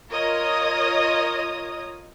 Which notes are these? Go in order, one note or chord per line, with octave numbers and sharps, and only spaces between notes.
F4 A#4 C#5 D#5 D#6